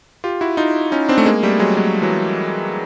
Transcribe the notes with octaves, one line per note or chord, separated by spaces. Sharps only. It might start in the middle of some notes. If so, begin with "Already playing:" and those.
F4 G4
E4 F#4
D#4 F4
C#4 D#4
C4 D4
A3
G#3 A#3
G3 A3
F#3 G#3
F#3 G#3
E3 F#3